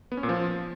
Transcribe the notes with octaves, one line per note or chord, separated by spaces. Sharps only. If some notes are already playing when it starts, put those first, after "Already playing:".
B3
C#4
A#2
F3